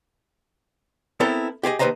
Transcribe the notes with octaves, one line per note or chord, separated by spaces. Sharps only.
B3 C4 E4 A4 A#4
G4 G#4 C5 D#5
D#2 A#3 B4 C5 D#5 A#5